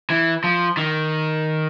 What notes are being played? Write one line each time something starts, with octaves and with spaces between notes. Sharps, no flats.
E3
F3
D#3